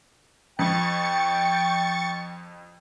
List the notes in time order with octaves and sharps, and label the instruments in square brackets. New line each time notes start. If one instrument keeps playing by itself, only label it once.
[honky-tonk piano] F2 [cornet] G5 [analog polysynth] C#6 A6 C#7